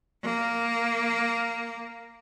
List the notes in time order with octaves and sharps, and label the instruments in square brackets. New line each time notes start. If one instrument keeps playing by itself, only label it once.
[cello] A#3